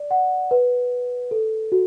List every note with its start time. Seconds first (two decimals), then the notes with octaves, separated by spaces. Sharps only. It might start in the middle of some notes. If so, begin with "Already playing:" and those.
Already playing: D5
0.11 F#5
0.51 B4
1.31 A4
1.72 F#4